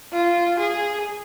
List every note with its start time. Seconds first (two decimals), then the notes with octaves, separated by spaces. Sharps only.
0.13 F4
0.59 G#4